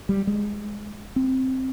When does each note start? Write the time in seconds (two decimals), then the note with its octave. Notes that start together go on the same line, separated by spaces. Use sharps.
0.09 G3
0.27 G#3
1.16 C4